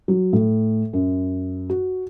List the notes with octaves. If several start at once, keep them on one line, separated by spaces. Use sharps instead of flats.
F#3
A2
F#2
F#4